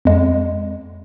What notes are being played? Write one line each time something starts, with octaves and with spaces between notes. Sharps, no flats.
F2 G#3